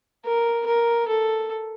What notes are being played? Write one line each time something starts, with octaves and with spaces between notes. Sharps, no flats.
A#4
A#4
A4